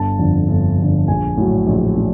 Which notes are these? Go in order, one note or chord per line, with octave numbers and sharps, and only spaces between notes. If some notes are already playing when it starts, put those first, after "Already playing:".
Already playing: G1 A5
F2 D3
G1
F2 D3
A#1 G#5
A2 F#3
A#1
A2